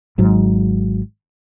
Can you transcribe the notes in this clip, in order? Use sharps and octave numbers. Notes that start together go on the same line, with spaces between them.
G#1 G#2 F#3